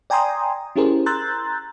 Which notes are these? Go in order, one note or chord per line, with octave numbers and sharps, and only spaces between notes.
D5 G5 G#5 A#5 C6 D#6
C#4 E4 G4 G#4 A#4 C5
A#5 C6 E6 F#6 G6 A6